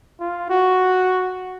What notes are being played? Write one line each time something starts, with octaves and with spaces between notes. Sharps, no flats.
F4
F#4